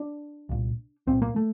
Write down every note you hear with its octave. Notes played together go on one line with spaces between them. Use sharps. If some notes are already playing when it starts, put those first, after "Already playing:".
Already playing: D4
C2 A#2
C2 A#2 C4
A#3
A3